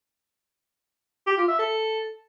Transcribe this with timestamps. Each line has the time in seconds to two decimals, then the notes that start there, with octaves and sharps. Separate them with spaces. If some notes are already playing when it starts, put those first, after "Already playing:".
1.27 G4
1.37 F4
1.48 E5
1.59 A4